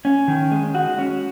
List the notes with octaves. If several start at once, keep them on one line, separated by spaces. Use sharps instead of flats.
C#4
D#3
G#3
F#4
C#4